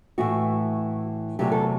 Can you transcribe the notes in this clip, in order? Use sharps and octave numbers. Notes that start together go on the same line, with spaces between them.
A2 E3 A3 F#4
E2 C3 F#3 A3 G4
A4